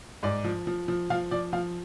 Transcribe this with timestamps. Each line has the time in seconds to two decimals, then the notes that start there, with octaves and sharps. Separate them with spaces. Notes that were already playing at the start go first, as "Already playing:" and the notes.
0.23 G#2 D5
0.44 F3
0.67 F3
0.88 F3
1.10 F3 F5
1.31 F3 D5
1.53 F3 F5